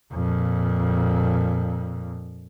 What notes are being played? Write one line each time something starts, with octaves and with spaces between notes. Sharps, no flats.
F2 A#2